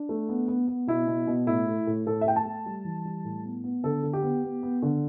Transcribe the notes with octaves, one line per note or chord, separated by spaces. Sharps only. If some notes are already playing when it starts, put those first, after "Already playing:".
Already playing: D4
A3
B3
B3
B3
B2 E4
B2
B2
A2 E4
A3
A2
A2 A4
E5
A3 G5
A5
A3
G3
E3
G3
A2
B3
B3
D3 A4
D3
G4
B3
B3
B3
D3